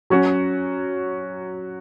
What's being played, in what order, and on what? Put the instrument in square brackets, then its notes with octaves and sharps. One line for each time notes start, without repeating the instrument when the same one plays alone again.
[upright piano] F#3 C#4 F#4